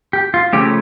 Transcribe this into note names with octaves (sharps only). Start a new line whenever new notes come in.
G4
F4
C#3 F3 A3 C#4 G4